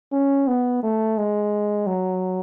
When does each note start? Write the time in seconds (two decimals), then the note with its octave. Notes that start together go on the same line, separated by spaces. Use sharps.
0.12 C#4
0.47 B3
0.83 A3
1.18 G#3
1.87 F#3